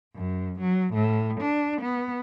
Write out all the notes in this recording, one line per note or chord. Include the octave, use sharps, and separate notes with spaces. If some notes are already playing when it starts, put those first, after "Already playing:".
F#2
F#3
A2
D4
B3